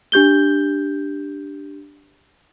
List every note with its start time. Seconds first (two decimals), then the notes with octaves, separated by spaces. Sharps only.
0.12 D4 G4 G6 G7